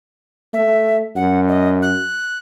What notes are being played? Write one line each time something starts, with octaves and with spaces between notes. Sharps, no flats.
A3 E5
F#2 F#5
D#5
F#6